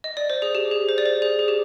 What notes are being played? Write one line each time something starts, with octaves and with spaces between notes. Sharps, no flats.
D#5
D5
C5
G#4
G4
G#4
C5
D5
C5
G#4
G#4
G4